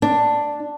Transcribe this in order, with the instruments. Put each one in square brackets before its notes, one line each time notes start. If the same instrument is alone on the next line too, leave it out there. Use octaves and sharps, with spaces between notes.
[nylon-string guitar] D4